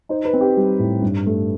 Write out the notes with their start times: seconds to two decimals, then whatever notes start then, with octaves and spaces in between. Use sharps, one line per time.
0.09 D#4 C5
0.25 B4
0.33 C4
0.41 G4
0.57 G3
0.79 A2
1.02 G2
1.26 A3